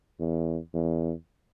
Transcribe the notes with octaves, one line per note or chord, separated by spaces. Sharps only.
E2
E2